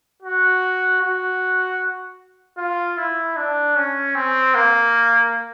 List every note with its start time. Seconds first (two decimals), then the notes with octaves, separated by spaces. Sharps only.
0.23 F#4
1.01 F#4
2.58 F4
2.97 E4
3.37 D4
3.76 C#4
4.15 C4
4.54 A#3